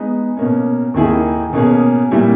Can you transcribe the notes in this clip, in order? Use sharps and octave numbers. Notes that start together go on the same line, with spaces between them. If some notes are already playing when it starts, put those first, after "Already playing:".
Already playing: G#3 B3 D#4
B2 A#3 C#4
D#2 D#3 A#3 E4 G#4
B2 A#3 C#4 G#4
A#2 G3 A#3 E4